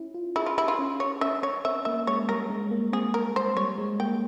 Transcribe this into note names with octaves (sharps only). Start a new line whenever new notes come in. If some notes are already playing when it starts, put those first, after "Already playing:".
Already playing: C#4 E4
F4
E4 G#4
F4
E4 G4
F4
C#4
C#5
C#4 E5
C#4 C#5
C4 E5
A#3 E5
G#3 C#5
G3 A#4
G#3
A#3
C4 G#4
A#4
C5
G3 C#5
G#3
A#3 G5